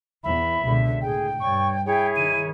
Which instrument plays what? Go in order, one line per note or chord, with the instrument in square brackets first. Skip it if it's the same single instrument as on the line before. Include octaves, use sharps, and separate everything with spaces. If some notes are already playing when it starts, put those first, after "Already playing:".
[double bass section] E2 [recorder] E5 [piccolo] B5
[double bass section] C#2 B2 D3
[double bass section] A2 [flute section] G#4 [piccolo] G5
[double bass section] G2 [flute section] C#5 D5 [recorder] C#6
[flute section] E4 G#4 [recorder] C#5 [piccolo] G5
[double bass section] D#3 [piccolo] D#7